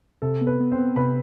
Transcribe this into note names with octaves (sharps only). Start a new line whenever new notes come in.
C3 A4
B3
B4
B3
C4 C5
B3
C3 B4 B5